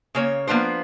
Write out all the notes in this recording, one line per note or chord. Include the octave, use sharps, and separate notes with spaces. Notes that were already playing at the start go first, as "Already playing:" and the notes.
C#3 A#3 C#5
F3 A#3 B3 D4 C5